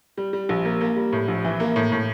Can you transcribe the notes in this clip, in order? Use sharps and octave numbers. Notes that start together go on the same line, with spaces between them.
G3
G3
A#1
A#3
A#3
G3
A2
A#1
E3
A#3
A2
A2